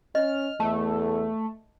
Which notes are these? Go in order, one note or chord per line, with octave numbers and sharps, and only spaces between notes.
C#4 D#5 F6
E2 A3 A5